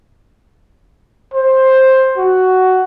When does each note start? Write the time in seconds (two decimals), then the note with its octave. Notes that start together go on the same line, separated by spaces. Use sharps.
1.34 C5
2.18 F#4